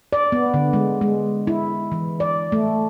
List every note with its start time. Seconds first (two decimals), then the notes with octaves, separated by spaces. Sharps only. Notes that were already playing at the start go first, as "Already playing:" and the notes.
0.13 D5
0.32 B3
0.54 D3
0.73 G#3
1.01 G#3
1.47 E4
1.92 E3
2.20 D5
2.52 A3